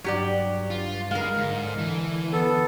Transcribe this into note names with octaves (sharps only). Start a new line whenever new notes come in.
G2 F#3 G4 D5
F4
G#3 A#4 F5
G#2 D3
E3
B3 A4